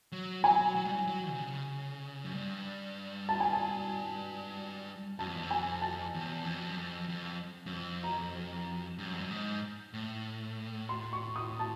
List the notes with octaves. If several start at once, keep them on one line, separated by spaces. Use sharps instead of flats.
F#3
F#3 G#5
F#3
G3
F#3
F#3
C3
C#3
F#2
G2
A5
G#5
A5
F#2 A5
F2
E2
F2
G#5
A5
E2
F2
F#2
F2
F2
F#2
F2
A#5
G2
F#2
F2
F#2
G#2
A2
C6
C#6
D#6
A5